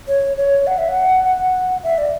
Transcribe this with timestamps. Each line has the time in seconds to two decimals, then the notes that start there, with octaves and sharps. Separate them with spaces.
0.08 C#5
0.37 C#5
0.67 F#5
0.78 E5
0.89 F#5
1.25 F#5
1.84 E5
1.98 D5